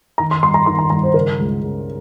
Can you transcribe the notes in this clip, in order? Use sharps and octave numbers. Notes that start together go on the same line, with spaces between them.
D#3 A#5
C6
G2 C6
A#5
D#3 C6
A#5
G2 A#5
C5
C#3 A#4
C#2
C#3